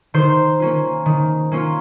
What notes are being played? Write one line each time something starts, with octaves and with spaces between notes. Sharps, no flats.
D#3 C5
A#3 C#4 F4
D#3
A#3 C#4 F4